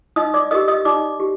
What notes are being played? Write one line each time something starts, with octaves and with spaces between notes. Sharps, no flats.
D#4 D#5 D#6
D5 D6
G4 A#4 D#5 D#6
D#5 D#6
D#4 D5 D6
G4